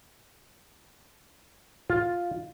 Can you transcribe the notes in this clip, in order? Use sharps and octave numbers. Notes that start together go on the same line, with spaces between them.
F4